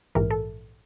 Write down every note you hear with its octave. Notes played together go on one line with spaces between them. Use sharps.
A#1 G#2 E3 A#4
A4